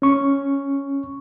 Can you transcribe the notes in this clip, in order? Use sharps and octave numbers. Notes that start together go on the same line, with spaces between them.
C#4 C#6